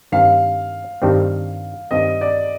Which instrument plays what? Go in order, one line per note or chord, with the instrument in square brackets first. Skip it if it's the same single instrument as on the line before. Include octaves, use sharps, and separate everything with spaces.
[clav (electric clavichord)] G2 D#3 G3 C4 [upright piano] F5
[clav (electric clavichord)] G2 D#3 G3 C4
[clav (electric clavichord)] G2 D#3 G3 C4 [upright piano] D#5
[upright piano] D5